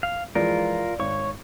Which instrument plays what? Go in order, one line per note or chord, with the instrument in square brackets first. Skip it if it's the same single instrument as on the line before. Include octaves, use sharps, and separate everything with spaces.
[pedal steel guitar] F5
[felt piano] E3 F3 G#3 [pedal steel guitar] F4 A#4 [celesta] D5
[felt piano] G#1 [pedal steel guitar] C#5 C#6